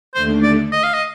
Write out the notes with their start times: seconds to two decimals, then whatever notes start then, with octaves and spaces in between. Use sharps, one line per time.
0.14 D#2 D3 A3 C5
0.43 D5
0.72 D#5
0.83 F5
0.94 D#5